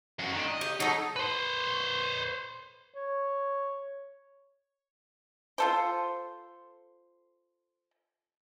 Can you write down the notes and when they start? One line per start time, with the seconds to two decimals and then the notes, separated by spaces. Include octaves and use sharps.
0.19 F#2 F#4
0.33 D#3 D4
0.45 D#5
0.61 G4
0.80 F#3 D#4 A4
1.16 B4 C5
2.94 C#5
5.58 F4 A4 C5